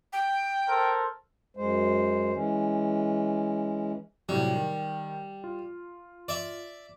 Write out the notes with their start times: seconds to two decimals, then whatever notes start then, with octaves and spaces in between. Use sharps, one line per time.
0.13 G5
0.69 A4 A#4 C5
1.57 F#2 G#3 C5
2.33 E3 G#3 C#4
4.29 A2 C3 F#3 G3
4.56 D#3
5.44 F4
6.28 D5 E5